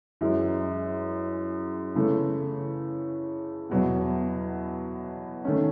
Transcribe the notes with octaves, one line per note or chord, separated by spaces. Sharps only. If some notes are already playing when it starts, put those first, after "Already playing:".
F#2 E3 G#3
C#3 E3 A3
E2 B2 F#3 B3
D#3 A3 C#4